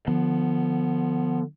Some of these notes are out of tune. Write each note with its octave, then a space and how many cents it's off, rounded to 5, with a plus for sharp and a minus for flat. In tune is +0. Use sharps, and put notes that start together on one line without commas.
D3 +30 F3 +0 B3 +0